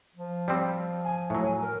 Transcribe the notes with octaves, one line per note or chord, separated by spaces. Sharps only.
F3
G3 C4
G#5
A2 F#3
A#4